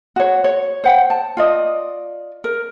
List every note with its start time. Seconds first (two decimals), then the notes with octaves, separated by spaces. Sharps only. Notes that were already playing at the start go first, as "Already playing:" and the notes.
0.16 F#4 C#5
0.44 C#5
0.84 C5 F#5 G5
1.10 A5
1.37 F4 D5 D#5
2.44 A#4